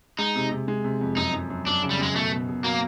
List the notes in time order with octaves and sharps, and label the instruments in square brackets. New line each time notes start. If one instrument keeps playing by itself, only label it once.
[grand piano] G#3 [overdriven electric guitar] D#4
[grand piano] C3
C3
G#3
C3
F2
[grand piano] F#2 [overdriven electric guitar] D#4
[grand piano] F#2
F#2
[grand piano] F#2 [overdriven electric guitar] D4
[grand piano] C#3
[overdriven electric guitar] G3
[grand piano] F#2 [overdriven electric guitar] G#3
[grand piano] B2 [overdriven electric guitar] A3
[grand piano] B2
B2
[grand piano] F#3 [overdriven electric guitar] A#3